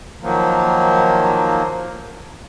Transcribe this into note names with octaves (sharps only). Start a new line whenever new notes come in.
D#3 F3 F#3 A#3